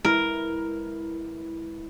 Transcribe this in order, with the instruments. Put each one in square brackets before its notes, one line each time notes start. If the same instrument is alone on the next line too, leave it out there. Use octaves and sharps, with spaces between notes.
[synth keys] G#3 E4 B4 [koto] A#4